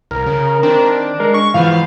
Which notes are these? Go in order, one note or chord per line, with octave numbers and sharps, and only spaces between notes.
C2 A#4
C#3
D#3 C4 D4
G#3 A#4
C#6
G#2 E3 F3 B3 F5